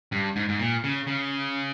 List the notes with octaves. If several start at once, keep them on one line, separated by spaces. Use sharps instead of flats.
G2
G#2
G#2
A#2
C#3
C#3